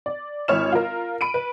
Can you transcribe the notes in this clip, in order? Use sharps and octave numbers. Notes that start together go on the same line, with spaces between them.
D5
G#1 E4 C#5 F6 E7
F4 A#4
B5 D7 D#7
B4